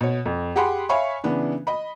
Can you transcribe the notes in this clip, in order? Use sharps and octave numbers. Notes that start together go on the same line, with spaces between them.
B2 C#5
F2
G4 G#4 F#5 B5 C6
C#5 E5 F5 G#5 B5 C#6
C#3 E3 B3 D4
D#5 B5